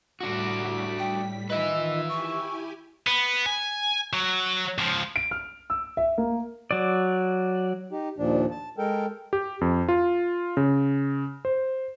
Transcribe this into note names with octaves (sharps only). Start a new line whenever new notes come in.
A2 G3 D4 F#4 B6
G5
D#3 F4 B4 D#5 E5
E4 G4 G#5 C#6
B3
G#5
F#3
C#2 F3
D7
F6
E6
E5
A#3
F#3 D5
D#4 G4
D#2 A#2 F3 D4
A5
G#3 A4 A#4 G5
G4
F2
F4
C#3
C5